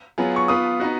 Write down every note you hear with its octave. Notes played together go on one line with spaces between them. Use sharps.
F#3 B3 F4 G#4
C#6
B3 F4 B4 D#6
B3 D#4 F#4